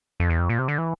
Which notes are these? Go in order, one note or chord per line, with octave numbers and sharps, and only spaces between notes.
F2
E2
F2
A#2
C3
D3
E3